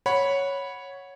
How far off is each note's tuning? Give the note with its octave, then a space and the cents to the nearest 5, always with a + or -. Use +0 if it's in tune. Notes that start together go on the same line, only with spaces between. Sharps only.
C#5 +0 F#5 -10 B5 -5